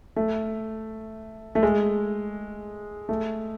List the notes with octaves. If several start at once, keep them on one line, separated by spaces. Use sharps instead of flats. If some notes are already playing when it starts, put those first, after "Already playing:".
A3
A3
G#3
A3